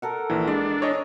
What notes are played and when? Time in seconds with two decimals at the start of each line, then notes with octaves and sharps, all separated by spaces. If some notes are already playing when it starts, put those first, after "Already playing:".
0.02 A4 A#4 F#5
0.30 A#1 E3
0.48 G#3 D4 D5
0.82 C#5 D#5 G#5 C#6